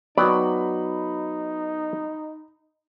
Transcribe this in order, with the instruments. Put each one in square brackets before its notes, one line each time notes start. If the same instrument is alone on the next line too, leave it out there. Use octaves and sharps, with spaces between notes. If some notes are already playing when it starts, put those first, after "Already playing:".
[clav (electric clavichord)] F#3 B3 G5 [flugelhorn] D#4 [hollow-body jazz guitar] F#4 D5 [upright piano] B5